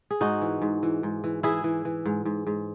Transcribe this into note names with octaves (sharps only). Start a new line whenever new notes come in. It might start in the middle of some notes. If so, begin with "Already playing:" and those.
G#4
G#2 D#4 F#4
E3
G#2
E3
G#2
E3
E3 E4 G#4
E3
E3
G#2
G#2
G#2